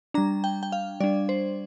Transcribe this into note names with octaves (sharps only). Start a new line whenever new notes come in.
G3 D4 A#5
G5
G5
F5
G3 D4 D5
C5